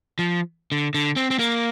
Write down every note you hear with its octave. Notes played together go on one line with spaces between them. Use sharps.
F3
D3
D3
C4
C4
A#3